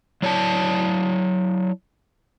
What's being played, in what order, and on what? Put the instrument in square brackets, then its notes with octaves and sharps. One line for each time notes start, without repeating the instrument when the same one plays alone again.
[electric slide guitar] F#3 E4 C#5 D5 G5 A5